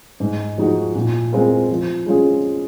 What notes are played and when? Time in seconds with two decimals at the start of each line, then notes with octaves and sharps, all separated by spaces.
0.20 G#2
0.58 F3 G#3 D#4 F#4
0.96 A#2
1.32 G#3 C4 F4 A#4
1.70 F3
2.06 G#3 C#4 F4 G#4